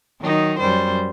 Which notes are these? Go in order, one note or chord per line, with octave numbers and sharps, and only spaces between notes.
D#3 F#3 D#4
F#2 G3 C5